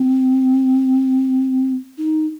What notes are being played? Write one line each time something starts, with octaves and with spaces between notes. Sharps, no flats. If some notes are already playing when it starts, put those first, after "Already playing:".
Already playing: C4
D#4